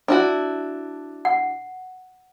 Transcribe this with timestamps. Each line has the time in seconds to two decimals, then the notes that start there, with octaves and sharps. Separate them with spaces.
0.08 D4 E4 F#4
1.25 F#5